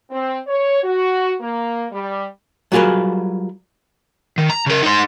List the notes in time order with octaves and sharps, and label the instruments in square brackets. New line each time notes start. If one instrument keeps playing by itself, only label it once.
[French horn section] C4
C#5
F#4
A#3
G3
[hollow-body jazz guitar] F#3 G3 F4 G#4 A#4 B4
[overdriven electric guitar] D#3
A#5
C#3 A#4
D#4 C5